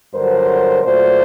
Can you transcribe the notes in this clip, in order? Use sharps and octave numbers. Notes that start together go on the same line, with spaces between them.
G2 D3 F#3 A#4 C5
A#2 F#3 A3 C5 D5